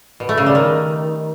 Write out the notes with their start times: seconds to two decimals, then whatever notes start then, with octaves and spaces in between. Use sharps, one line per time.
0.20 B2
0.29 A3
0.38 C#3
0.46 G3
0.55 D#3